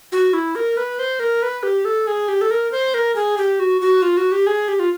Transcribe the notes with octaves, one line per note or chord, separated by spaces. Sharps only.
F#4
E4
A#4
B4
C5
A#4
B4
G4
A4
G#4
G4
A4
A#4
C5
A#4
G#4
G4
F#4
F#4
F4
F#4
G4
G#4
G4
F4